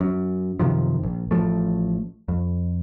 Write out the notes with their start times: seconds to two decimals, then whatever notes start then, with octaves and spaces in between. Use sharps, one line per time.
0.01 F#2
0.59 F#2 C3 D#3 F3
1.03 A#1
1.31 A1 C#3 F3 A3
2.28 F2